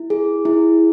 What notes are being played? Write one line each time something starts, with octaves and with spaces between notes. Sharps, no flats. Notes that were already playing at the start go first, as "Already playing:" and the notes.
Already playing: E4
G#4
E4